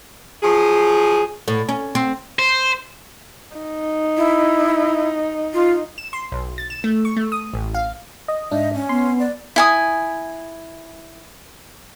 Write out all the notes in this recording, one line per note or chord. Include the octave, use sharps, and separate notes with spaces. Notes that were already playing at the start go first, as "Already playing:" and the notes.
F3 F#3 G#4
A2
C#4
C4
C5
D#4
E4
F4
E7
C6
B1
A6
E7
A3
C#6
A3
D#6
A1
F5
D#5
G#2 D4 D#5 E5
C#4
B3 C6
D5
E4 G#5 D#6